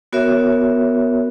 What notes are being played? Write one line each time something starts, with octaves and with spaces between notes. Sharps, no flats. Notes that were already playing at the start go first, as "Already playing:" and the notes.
B3 F#4 A#4 C#5 E5